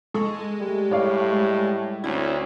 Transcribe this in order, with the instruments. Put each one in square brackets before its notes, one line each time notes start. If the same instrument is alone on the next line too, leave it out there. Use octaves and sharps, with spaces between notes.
[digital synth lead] G#3 [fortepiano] A4 C#6
[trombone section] G3 A3
[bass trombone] A2 [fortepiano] C#5 D5 F5
[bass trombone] D2 [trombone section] A3 C4 C#4 [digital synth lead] E4